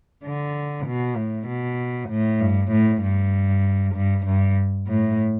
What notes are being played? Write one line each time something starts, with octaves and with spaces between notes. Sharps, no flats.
D3
B2
A2
B2
A2
G2
A2
G2
G2
G2
A2